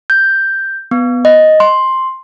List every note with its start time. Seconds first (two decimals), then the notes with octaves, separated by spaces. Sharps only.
0.10 G6
0.91 B3
1.25 D#5
1.60 C6